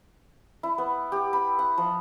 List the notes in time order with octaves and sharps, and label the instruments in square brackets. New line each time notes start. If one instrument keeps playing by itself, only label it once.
[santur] E4
B3
G4
B5
F#5
F3